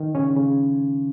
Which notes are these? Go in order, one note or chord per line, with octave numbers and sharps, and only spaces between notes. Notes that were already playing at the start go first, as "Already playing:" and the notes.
Already playing: D#3
C#3 C#4
C#3